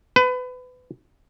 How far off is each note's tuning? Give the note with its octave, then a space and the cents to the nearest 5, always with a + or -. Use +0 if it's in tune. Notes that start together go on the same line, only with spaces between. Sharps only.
B4 +25